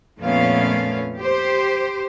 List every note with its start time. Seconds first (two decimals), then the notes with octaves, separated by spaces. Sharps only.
0.20 F2 A#2 A3 B3 C#4 F5
1.17 G4 C5